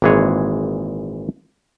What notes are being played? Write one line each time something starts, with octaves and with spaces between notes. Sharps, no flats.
G#1 A#2 E3 G#3 G#4 C#5